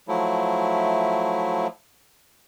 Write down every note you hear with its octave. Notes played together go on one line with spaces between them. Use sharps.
F3 F#3 A3 E4